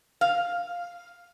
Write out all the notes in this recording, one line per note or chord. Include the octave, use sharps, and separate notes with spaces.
F5